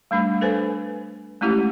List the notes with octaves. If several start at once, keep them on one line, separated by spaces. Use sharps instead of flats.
G3 A3 D4
A4 B4 C5 G#5
G#3 A3 C#4 E4 G4